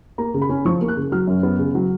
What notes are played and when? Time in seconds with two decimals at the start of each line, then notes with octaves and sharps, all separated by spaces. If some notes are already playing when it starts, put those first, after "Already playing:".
0.18 A#3 A#5
0.34 C#3
0.42 B5
0.49 C#4
0.65 F3 C#6
0.81 A#3
0.88 F#6
0.97 C#3
1.12 F#3 F6
1.27 F#2
1.43 B3
1.59 C#3
1.75 F#3